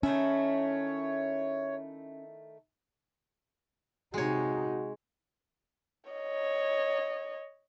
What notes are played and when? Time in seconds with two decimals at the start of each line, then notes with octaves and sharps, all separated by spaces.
0.03 D#3 A3 C#4 E4 C#5
4.14 C3 G#3 D#4 F#4 C#5
6.10 C#5 D#5